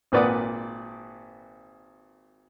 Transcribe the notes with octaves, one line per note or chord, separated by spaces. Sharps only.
G#1 A#2 B4 D5 F#5 D#6